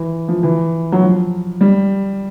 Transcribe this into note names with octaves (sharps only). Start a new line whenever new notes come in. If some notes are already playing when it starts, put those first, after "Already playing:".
Already playing: E3
F3
E3
F#3
F3
G3